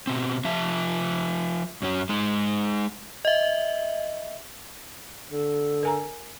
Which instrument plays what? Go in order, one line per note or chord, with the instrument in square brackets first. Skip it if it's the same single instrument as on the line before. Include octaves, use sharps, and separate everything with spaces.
[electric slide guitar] B2 C4
F3 F4 E5 A5
F#2 C#4 F#4
G#3 D#4
[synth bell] D#5 E5
[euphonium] D3 [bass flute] A4
[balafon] A#4 G#5 A#5